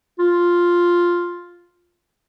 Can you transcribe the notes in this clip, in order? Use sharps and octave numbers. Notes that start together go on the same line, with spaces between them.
F4